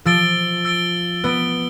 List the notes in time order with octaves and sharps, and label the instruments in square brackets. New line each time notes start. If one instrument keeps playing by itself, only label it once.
[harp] F3 [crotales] E6 A6 D7 G7
[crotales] E6 A6 D7 G7
[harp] B3 [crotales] E6 A6 D7 G7